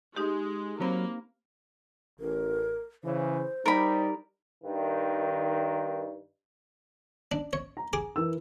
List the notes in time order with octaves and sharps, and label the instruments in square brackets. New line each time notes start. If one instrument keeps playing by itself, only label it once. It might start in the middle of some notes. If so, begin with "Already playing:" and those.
[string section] G#3 [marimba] D#4 G4
[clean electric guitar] F#3 [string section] A#3 [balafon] C4 C5 B5
[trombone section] A1 [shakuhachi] A#4
[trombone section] C#3 E3 [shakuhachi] C5
[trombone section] G3 D#4 [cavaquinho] A#4 B5
[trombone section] G2 D#3
[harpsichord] D4
C#5
[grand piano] A#5
[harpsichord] G#4 D6
[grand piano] E3 A#4 E6